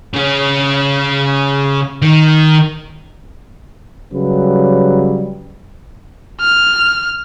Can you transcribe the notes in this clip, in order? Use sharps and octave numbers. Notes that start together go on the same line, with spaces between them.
C#3 C#4
D#3
C#3 F#3 G3 B4
F6